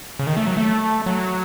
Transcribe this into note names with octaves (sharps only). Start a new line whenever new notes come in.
C#3
D#3
A3
F#3
A3
F#3